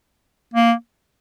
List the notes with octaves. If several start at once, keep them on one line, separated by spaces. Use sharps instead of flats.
A#3